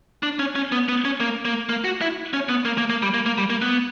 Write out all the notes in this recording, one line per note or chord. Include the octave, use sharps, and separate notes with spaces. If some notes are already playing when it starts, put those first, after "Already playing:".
D4
C#4
C#4
B3
B3
C#4
A#3
A#3
A#3
F#4
E4
C#4
B3
A#3
A#3
A#3
G3
A#3
A#3
G3
A#3
B3